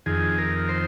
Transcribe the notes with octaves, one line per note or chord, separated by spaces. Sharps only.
F2 D#3 G#4
A#4
C5